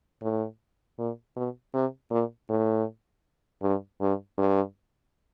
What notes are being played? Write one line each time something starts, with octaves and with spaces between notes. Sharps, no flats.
A2
A#2
B2
C3
A#2
A2
G2
G2
G2